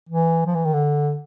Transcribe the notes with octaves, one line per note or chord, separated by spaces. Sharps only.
E3
F3
E3
D#3
D3